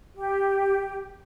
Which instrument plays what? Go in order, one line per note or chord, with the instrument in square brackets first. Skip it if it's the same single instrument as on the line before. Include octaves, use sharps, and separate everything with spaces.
[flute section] G4